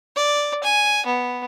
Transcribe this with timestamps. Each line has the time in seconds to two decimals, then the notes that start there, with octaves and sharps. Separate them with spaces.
0.16 D5
0.64 G#5
1.06 B3